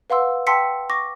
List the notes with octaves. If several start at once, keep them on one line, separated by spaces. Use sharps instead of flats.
B4 F5 F#5 C6 E6
G5 A5 C6 E6 B6 C#7
C#6 D6 A#6